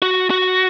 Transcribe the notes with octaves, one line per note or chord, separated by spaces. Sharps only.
F#4
F#4